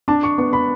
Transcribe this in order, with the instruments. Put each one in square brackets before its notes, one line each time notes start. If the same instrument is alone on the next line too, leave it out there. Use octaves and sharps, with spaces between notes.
[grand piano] D4 A5
C#6
B3 C#6
B5